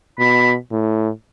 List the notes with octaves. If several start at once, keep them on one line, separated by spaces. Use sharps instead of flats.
B2 B5
A2